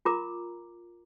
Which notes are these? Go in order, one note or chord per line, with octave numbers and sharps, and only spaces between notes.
F4 A#4 A#5 D6